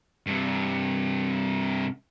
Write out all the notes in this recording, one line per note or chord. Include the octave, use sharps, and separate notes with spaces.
G2 C3